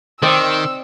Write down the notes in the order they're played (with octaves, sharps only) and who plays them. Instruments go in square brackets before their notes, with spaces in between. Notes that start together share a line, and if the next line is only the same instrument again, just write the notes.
[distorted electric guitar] D#3 [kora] C4 D5 D#5 [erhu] E6